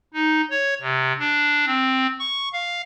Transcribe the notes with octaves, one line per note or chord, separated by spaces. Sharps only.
D#4
C#5
C3
D4
C4
C#6
F5